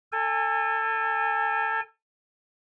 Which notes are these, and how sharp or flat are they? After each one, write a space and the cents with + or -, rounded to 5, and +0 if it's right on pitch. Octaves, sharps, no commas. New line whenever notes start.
A4 +20 G#5 -25